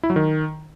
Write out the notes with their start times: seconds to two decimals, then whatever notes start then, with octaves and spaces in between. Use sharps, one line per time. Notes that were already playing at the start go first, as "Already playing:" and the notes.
0.03 E4
0.10 F#3
0.16 D#3